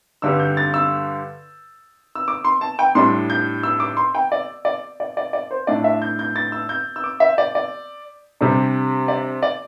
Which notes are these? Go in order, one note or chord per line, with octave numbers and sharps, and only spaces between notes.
G2 D3 G3 E6
G6
A6
E6
E6
D6
C6
A5
G5
A2 G3 D4 C6
G6
E6
D6
C6
G5
D5
D5
D5
D5
D5
C5
A2 A3 D4 D5
E5
G6
G6
A6
E6
G6
E6
D6
E5
D5
D5
C3 G3 D4
D5
D5